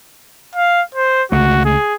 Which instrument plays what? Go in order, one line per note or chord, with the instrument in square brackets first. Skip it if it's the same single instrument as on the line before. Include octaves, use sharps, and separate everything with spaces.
[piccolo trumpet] F5
C5
[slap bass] C#2 A3 [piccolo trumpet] F#4
[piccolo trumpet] G#4